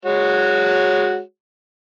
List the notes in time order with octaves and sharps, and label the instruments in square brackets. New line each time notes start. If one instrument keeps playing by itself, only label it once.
[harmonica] G#3 F#4 C#5